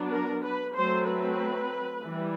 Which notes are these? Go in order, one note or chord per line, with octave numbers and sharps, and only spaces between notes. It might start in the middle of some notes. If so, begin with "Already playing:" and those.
Already playing: F#3 B3 D4
A#4
B4
F#3 A3 C4 C5
B4
E3 G3